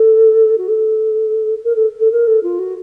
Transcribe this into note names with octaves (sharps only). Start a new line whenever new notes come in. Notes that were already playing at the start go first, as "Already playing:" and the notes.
Already playing: A4
F#4
A4
A#4
A4
A4
A#4
A4
F4
F#4